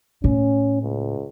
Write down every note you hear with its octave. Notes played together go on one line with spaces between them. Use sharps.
A2 C#4
C#2